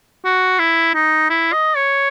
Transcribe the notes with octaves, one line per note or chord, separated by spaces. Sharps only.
F#4
E4
D#4
E4
D#5
C#5